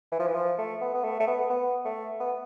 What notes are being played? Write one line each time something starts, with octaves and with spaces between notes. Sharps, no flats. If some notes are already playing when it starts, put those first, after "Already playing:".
E3
F3
E3
F3
A3
B3
B3
A3
A3
B3
B3
A3
B3